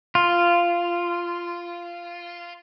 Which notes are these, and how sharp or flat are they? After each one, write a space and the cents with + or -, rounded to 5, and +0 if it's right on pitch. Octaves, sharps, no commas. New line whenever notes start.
F4 -10